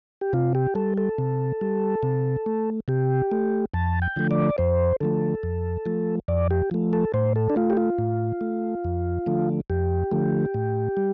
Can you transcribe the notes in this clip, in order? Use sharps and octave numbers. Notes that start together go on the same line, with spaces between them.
G4
C3 F4
G4
G3 A4
A4
C3
G3
C3
A3
C3 G4
A3
F2 A5
G5
D3 F3 A3
D5
F2 C5
D3 F3 A3 A4
F2
F3 A3
F2 D5
G4
F3 A3
A4
A2 C5
A4
D4
A3 F4
G4
F4
A2
A3
F2
D3 F3 A3
F2 G4
D3 F3 A3
A2
G3